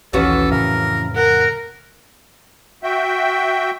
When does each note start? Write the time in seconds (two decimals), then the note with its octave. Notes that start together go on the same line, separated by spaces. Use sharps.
0.13 A#1 D#2 E3 C#4 F#4 A4
0.51 F2 A2 C#3 A#4
1.16 A#4 F#5
2.83 F#4 E5 G5